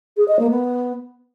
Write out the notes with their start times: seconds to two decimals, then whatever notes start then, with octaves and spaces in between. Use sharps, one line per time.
0.17 G#4
0.28 D#5
0.39 A#3
0.50 B3